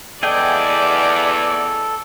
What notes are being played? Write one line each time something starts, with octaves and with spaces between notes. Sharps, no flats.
E2 G#4 A4 D5 D#5 G5